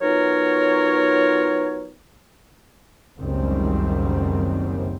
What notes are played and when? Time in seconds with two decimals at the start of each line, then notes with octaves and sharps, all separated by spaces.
0.02 F#3 B3 D#4 F4 A#4 C#5
3.20 F#1 C#2 F#2 D#3 G3 C4